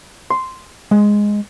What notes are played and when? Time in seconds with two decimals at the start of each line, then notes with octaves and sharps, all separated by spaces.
0.30 C6
0.91 G#3